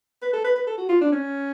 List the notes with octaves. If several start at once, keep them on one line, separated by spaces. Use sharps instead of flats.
B4
A4
B4
B4
A4
F#4
F4
D4
C#4